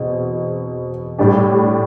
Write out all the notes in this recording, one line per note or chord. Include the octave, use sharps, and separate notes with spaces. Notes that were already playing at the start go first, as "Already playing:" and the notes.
Already playing: E2 B2 C4
A2 G3 D4 G4